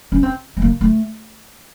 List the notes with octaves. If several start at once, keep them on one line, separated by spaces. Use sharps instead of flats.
C#4
C4
A3
A#3
A3